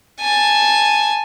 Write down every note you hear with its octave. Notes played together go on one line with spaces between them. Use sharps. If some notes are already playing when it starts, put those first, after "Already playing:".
G#5 A5